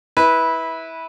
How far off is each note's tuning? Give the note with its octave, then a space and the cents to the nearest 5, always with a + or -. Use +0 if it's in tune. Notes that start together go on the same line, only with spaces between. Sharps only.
E4 -20 B4 -10